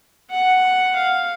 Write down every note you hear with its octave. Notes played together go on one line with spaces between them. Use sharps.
F#5
F5